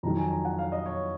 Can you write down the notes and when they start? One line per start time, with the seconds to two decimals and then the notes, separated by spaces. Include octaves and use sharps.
0.03 F2 D#3 F#3 A#5
0.17 G#5
0.31 A#5
0.45 F#5
0.59 F5
0.72 D#5
0.86 C#5